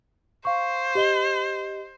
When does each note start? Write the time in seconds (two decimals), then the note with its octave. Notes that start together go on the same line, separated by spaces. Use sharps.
0.45 C5 F5 C#6
0.95 G4 D#5 G7